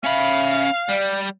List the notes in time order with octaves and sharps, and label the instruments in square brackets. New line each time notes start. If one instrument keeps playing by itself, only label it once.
[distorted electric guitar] C#4 B5 [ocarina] E5 [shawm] F5
[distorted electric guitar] G3 [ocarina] D5